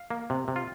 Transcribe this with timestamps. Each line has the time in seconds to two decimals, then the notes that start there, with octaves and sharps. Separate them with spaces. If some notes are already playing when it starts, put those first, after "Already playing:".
Already playing: F5
0.10 A#3
0.30 C3
0.48 C3
0.56 F4